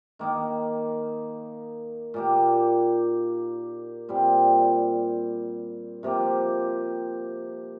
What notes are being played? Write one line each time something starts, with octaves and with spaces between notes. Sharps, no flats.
D#3 A#3 D#4
A#2 A#3 G4
A#2 G3 C4
C3 F3 A#3 G4